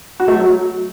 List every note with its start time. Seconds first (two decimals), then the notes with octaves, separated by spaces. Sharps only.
0.20 F#4
0.28 A3
0.36 F#3